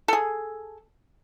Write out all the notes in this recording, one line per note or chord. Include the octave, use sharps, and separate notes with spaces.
G#4 A4